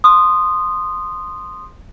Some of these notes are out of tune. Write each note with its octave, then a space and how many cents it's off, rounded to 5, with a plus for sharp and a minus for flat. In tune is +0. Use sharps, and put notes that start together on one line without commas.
C6 +0 D#6 -15